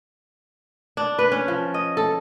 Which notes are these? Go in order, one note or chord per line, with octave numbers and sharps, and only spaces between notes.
D4
B4
C#4
F3
D#5
A4